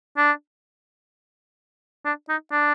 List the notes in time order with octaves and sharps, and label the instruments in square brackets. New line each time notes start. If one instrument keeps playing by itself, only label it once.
[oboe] D4
D4
D#4
D4